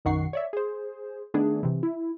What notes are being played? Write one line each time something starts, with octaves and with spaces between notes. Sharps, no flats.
B1 F#2 D#3 F#5 C#6 C7
C#5 D5 E5
G#4 C5
D#3 A3 B3 D4 G#4
C3 E3
E4